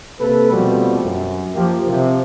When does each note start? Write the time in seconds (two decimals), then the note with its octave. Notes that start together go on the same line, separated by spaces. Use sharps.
0.19 C3 A#3 A4 B4
0.51 B2 F3 G3 A3 C4 F#4
1.04 F#2
1.55 F3 A#3 G4
1.87 C3 F3